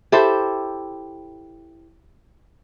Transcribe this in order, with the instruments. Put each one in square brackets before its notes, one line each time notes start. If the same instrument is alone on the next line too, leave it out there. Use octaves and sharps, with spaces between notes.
[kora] E4 G4 A4 C5